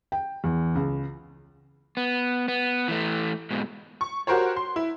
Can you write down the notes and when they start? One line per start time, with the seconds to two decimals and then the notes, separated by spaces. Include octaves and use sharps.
0.12 G5
0.44 E2
0.75 C#2
1.97 B3
2.48 B3
2.88 E3 A3
3.51 G#2 B2
4.01 C#6
4.27 F#4 G4 A#4 C5 C#5
4.56 C6
4.76 E4